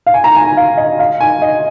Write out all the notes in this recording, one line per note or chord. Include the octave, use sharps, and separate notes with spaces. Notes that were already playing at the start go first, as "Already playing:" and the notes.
F5
G#5
A#5
G#5
G#5
F5
D#5
F5
G#5
D#5